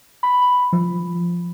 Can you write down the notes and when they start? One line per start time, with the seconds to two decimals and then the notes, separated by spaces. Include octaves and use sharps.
0.23 B5
0.73 F3